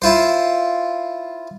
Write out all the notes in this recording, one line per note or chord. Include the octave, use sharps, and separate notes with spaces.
E4 F4 C5